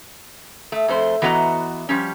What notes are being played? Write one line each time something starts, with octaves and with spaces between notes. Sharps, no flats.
A3
F2 A3 C5
E3 B3 F#4 D#5 A5 A#5
F3 G3 C#4